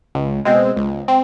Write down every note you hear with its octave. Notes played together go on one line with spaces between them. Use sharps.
C#2
B2 G#3 C4
C#2
C4